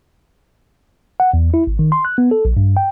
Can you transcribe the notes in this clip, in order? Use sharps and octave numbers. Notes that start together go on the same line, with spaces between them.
F#5
E2
E4
G#1
D#3
C6
F#6
B3
A4
A#1
G2
G5